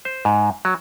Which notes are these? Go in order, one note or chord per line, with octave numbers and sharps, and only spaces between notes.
C5
G#2
F#3